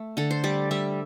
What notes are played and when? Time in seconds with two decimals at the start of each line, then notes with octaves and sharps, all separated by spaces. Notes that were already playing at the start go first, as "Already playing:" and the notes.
Already playing: A3
0.17 D3 A4
0.31 C5
0.44 G3 D5
0.71 G3 E5